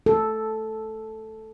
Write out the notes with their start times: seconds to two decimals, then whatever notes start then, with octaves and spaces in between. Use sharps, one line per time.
0.06 A4